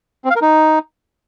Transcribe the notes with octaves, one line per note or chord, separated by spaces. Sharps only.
C4
F5
A#4
D#4